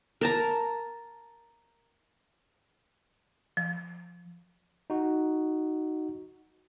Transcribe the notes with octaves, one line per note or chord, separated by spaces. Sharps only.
A#4 A5 A#5
F3
D#4 F#4